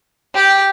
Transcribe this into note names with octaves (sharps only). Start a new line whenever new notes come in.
G4